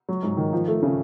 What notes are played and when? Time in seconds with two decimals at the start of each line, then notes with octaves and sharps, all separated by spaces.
0.09 F#3
0.23 G#2
0.37 D#3
0.53 F3
0.68 A3
0.83 C#3